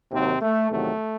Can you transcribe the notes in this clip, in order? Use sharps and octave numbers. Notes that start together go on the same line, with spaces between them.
D#2 C3 D#3 F#3 C4
A3
E2 C3 D#3 F#3 A3